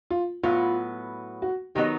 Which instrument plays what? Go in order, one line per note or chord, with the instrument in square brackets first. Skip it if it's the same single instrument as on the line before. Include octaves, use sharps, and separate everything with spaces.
[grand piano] F4
[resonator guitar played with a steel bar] A2 F#3 B3 [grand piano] F4
[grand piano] F#4
[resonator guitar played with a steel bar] D#3 F#3 B3 D#4 [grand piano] G4